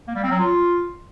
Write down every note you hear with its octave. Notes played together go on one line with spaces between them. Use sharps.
A#3
G3
C4
F#3
F4